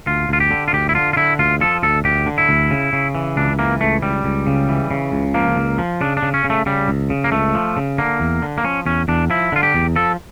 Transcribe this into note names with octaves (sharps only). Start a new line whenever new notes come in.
D2 F4
D2 F4
G4
D3
F4
D2 G4
E4
D3 F4
F4
D3 E4
D2 F4
F3 A4
D2 A4
D2 G4
D3
E4
D2
C#3
C#3
E3
C#2 D4
E3 A#3
C#2 A3
C#2 G3
C#2
C#3
E3
C#3
C#2
F3 A#3
C#2
F3
C#3 D4
D4
C#3
C#4
C#3
A3
C#3 G3
C#2
C#3
A#3
C#2 A3
F3
C#3
D3 A#3
E2
D3
A#3
F3 C#4
E2 C#4
E2 D4
F3 E4
D3 F4
G4
E2
F3 A4